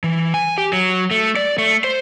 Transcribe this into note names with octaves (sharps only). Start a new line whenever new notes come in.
E3
G#5
G4
F#3
A3
D5
A3
C5